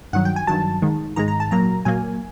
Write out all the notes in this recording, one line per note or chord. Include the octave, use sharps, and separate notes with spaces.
G2 D#3 F#3 F#5
G5
G#5
G2 D#3 F#3 A5
G#2 D#3 G#3
G#2 D#3 G#3 A#5
A#5
A5
A#2 F#3 A#3 A#5
A#2 F#3 A#3 G#5